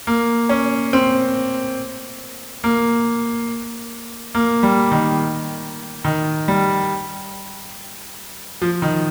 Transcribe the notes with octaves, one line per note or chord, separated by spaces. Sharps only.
A#3
C#4
C4
A#3
A#3
G3
D#3
D#3
G3
F3
D#3